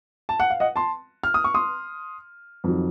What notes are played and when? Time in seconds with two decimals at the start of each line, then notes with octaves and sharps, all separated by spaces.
0.29 A5
0.40 F#5
0.50 F5
0.60 D#5 F#5
0.76 A5 C6
1.24 F6
1.34 D#6
1.44 C#6
1.54 C6 D#6
2.64 F2 D#3 F#3